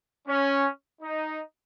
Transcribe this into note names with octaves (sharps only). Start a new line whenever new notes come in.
C#4
D#4